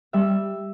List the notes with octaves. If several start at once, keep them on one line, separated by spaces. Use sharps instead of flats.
G3 E5